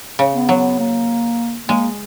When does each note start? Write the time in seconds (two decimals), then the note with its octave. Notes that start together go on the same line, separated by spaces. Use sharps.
0.19 C#3
0.34 B3
0.49 F#3
0.79 A#3
1.68 G#3 A#3